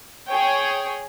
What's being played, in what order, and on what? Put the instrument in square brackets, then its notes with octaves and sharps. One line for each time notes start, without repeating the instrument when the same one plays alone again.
[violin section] G#4 C#5 G5